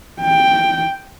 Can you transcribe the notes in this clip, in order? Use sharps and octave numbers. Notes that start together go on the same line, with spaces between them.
G5